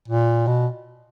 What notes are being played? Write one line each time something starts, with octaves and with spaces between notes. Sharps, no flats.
A#2
B2